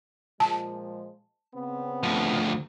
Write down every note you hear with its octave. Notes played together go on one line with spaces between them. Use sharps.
A#2 F3 G#3 A5
C#3 B3 C4
D2 F3